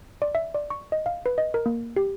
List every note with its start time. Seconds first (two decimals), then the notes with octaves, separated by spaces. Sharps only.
0.22 D5
0.35 E5
0.55 D5
0.70 C#6
0.92 D#5
1.06 F5
1.26 B4
1.38 D#5
1.54 A#4
1.66 A#3
1.96 G4